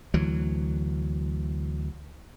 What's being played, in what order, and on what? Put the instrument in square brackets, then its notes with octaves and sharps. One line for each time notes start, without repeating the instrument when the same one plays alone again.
[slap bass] D2 E3 F#3